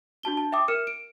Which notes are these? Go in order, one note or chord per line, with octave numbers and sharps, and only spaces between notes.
D4 F#4 A5 G7
A5
E5 G5 D6 D#6
A#4 F6 C#7 E7
D7